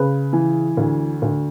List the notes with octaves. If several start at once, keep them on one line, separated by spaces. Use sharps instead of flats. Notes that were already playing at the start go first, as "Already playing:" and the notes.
Already playing: C#3 B4
E3
D2
D2